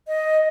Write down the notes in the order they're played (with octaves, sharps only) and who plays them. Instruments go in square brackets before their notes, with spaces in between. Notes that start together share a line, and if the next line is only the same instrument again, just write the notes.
[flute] D#5